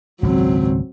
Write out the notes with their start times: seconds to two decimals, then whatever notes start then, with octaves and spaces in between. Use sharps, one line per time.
0.23 G#1 C#2 A#2 F#3 C4